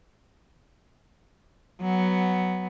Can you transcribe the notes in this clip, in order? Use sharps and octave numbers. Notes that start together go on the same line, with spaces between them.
F#3 B3